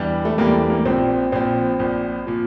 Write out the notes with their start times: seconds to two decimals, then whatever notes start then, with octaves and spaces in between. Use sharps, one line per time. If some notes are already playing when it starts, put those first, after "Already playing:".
Already playing: E2 E3 G3 D4 G4
0.25 A3
0.38 E2 E3 G3 A#3 D4 G4
0.54 A3
0.70 A#3
0.85 A#1 A#2 F3 C4
1.32 A#1 A#2 F3 C4
1.79 A#1 A#2 F3
2.27 A#2 F3